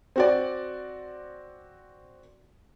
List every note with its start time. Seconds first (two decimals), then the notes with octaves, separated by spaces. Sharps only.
0.16 C4 F#4 D5